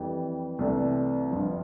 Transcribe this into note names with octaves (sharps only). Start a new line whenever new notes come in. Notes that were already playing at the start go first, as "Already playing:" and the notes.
Already playing: F2 E3 G3
C2 C3 E3 A3 D4
G1 G2 F3